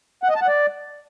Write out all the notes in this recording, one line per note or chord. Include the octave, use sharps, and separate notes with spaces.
F#5
D#5
A5
F#5
D5